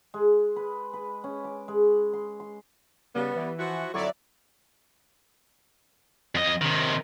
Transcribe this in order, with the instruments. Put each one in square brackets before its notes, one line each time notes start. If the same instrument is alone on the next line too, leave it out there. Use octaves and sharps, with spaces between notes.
[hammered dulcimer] G#3
B4
B4
C#4
D6
G#3
C6
C6
[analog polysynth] C#3 [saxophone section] G3 B3
[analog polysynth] E3
[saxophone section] F3 E4 F#4
[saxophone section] F2 D3 C#5 [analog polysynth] F#3 E4 D5
[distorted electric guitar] F2 D#5
C3 D#3